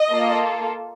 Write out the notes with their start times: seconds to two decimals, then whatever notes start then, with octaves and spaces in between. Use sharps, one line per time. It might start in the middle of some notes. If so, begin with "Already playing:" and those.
Already playing: D#5
0.11 A#3 F4 A4